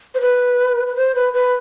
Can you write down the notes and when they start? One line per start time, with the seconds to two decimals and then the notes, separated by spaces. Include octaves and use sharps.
0.15 C5
0.21 B4
0.87 B4
0.96 C5
1.15 B4
1.33 B4